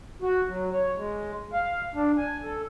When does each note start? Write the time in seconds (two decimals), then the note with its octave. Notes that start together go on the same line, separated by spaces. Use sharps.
0.22 F#4
0.49 F#3
0.72 C#5
0.96 G#3
1.53 F5
1.95 D4
2.18 G#5
2.44 A4